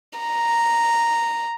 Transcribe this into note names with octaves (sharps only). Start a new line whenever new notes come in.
A#5